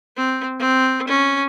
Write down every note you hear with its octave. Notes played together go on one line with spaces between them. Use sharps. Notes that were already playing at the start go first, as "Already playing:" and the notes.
C4
C4
C#4